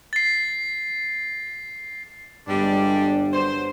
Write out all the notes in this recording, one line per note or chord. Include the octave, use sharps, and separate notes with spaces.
A6 C7
G1 G2 G3 G#3 D4
F#3 C5